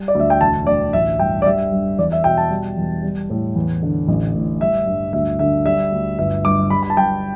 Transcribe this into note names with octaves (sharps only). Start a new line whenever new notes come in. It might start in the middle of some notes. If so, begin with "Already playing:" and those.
Already playing: G3
D5
D2 E5
G5
E1 A5
D2 D5
A1 E5
G2 G5
D5
G3 E5
G2
E2 D5
E5
B2 G5
A5
G3
E2
G3
A2
E2
D3
A1
A2
G3 E5
G2
D2 E5
D3 E5
G3 E5
D2
G1 E5
G2 D6
G3 B5
B5
A5
G2 G5